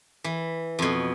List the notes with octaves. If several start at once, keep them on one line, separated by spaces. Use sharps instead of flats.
E3
F2 B2